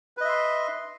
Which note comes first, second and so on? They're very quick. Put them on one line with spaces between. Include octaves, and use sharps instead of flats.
B4 D#5 E5 C6